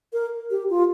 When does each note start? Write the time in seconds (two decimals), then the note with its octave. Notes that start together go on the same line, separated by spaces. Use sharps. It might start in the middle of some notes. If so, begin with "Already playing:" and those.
0.13 A#4
0.51 G4
0.70 F4